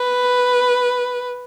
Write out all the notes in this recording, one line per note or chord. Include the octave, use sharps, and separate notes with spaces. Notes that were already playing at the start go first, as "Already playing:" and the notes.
Already playing: B4